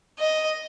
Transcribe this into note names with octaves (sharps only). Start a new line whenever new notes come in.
D#5